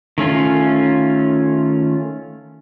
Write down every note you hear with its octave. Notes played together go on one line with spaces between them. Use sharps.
D#3 A3 C#4 F4